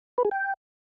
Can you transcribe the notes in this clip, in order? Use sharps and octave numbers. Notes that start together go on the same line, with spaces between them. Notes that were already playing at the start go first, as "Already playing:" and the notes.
B4
G#4
G5